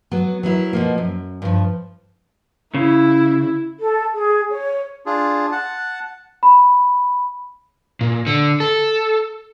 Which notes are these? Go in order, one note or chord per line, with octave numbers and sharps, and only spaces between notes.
F#3 B3
F#3 B3 E4 A#4
B2 F3 A#3
F#2
G2 F3
C#3 E4
A4
G#4
C#5
D4 F4 G#4
F#5 A5
B5
A#2
D3
A4